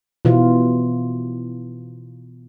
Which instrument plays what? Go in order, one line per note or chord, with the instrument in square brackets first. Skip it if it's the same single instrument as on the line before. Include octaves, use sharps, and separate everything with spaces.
[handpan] B2 E3 F4